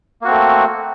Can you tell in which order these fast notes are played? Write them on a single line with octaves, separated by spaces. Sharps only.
A#3 F#4 C4 A3